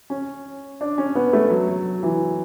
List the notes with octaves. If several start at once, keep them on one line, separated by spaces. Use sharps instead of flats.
C#4
D4
C#4
B3
A3
F#3
F#3
E3